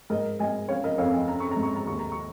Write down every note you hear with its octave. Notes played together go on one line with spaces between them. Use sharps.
G#2 A#4 D#5
G#2 D#5 G#5
C#4 C#5 F5
A#4 D#5
F2 C#5 F5
D#5 G#5
C#4 A#5
C#6
A#5
G#2
C#6
A#5
D#2 C#6
A#5
C#6